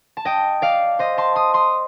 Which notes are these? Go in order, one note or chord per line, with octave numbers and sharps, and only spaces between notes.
A5
D#5 G5
D5 F5
C5 D#5
A5 C6
C6 D#6
C6 D#6